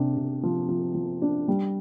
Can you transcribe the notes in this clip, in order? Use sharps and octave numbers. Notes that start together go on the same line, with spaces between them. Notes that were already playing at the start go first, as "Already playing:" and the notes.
Already playing: C3 D4
C3
F3
F3
F3
D4
G3